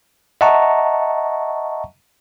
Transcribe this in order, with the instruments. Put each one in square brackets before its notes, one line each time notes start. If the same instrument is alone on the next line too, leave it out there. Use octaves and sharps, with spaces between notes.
[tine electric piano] D#5 E5 F#5 A5 A#5 C#6